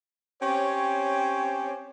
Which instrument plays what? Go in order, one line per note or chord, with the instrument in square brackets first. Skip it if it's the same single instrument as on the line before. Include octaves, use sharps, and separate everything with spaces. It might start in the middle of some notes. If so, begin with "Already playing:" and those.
[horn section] C4 C#4 G4 C#5